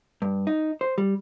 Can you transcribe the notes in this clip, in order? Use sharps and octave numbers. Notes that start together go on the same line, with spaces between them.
G2
D#4
C5
G3